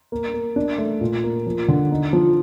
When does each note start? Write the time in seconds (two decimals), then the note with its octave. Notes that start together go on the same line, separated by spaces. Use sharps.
0.12 A#3
0.34 A#3
0.56 D4
0.78 A3
1.01 A#2
1.24 A#3
1.47 F3
1.68 D3
1.91 D#4
2.13 F3